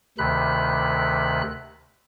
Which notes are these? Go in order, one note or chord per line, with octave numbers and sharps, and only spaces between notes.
D2 C3 D#3 B5 F#6